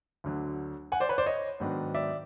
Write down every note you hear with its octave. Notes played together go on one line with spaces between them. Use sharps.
D2 D3 F#3
F#5 G#5
C5 D5
B4 C#5
C5 D5
C#5 D#5
G#2 D#3 F#3 B3 D4
D5 E5